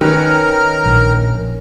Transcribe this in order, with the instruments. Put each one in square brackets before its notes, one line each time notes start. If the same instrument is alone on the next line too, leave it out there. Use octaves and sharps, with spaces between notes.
[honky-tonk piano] D#3 [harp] C#4 B4 [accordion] A#4 A#5 F6
[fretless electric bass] A#1